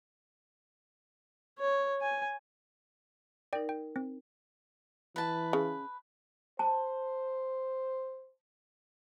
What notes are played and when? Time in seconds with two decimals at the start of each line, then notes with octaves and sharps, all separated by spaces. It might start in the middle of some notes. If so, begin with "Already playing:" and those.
1.58 C#5
2.01 G#5
3.53 D#4 A#4 D5 G5
3.69 G5
3.96 C4
5.16 E3 B4 A5
5.53 C#3
6.59 C5 A5